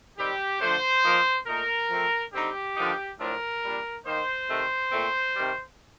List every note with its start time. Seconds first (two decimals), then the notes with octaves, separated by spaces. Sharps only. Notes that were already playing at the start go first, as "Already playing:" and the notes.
0.18 D#3 G3 C4 G4
0.61 D3 F3 A3 D4 C5
1.04 F3 A#3 D#4
1.47 A#2 A3 D#4 A#4
1.90 F3 A3 C4
2.33 D3 G3 C4 D#4 G4
2.77 D3 F3 A#3 D#4
3.20 A2 F3 A3 D4 A#4
3.63 A#2 G3 D4
4.06 D#3 A#3 D#4 C5
4.49 C3 D#3 A3
4.92 A#2 A3 C4
5.36 C3 D#3 G3